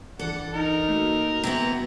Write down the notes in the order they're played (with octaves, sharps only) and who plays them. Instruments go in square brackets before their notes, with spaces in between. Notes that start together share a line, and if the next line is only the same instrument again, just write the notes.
[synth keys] G1 E3 [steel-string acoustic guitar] A4 [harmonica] D5 F#5
[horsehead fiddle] D#4 [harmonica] A#4
[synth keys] A3 A#3 F#4
[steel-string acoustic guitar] C3 E3 B3 [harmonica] A#5